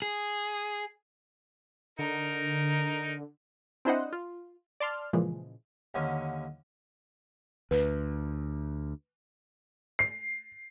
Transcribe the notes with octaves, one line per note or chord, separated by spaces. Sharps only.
G#4
D3 D#4 A#4
C4 D4 E4 C5 D#5 F#5
F4
D5 A5 C6 F6
A#2 C#3 E3 F3 G#3
D#2 D3 F#3 C#4
D2 B4
C7